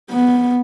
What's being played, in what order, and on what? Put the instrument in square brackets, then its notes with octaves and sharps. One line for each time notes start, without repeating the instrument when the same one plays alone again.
[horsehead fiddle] B3